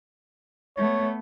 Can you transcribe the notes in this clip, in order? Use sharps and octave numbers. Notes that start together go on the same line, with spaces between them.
A3 B3 C#5